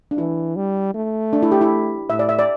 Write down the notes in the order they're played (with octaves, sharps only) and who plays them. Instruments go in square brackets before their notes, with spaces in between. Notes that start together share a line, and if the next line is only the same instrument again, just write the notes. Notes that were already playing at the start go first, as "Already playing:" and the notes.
[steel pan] D4
[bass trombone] E3 [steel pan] E4
[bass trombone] G3
A3
[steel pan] D4
E4
G4
E4
[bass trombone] A2 [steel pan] E5
[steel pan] D5
E5
D5